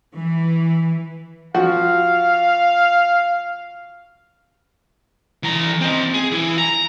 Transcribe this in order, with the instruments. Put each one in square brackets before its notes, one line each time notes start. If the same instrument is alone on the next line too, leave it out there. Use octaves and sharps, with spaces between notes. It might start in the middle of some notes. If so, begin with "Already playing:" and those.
[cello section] E3
[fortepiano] F3 F#4 [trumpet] F5
[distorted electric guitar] E3 A#5
C4 D#5
G#4
E3
A#5